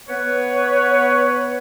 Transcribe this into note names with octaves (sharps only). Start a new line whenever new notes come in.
B3 B4 C#5